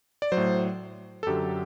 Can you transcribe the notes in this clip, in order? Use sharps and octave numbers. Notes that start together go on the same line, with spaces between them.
D5
F#3 C5
A2
A4
F#2 D3 F#3 G4